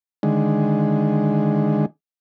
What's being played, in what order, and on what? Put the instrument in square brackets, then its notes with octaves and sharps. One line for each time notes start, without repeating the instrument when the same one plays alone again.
[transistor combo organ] D3 D#3 G#3